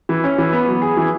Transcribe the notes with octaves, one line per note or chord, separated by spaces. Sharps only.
E3
C#4
E3
B3
F#3
G#4
E3